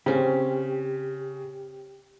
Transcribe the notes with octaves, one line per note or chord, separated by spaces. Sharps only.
C#3 C4 C#4 G4